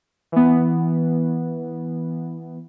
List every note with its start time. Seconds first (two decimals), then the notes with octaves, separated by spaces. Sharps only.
0.32 E3 B3